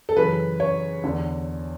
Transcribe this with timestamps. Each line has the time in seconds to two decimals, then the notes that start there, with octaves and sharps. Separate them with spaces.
0.09 A4
0.16 F#2 C#3 E3 B4
0.60 C#5
1.04 E2 D3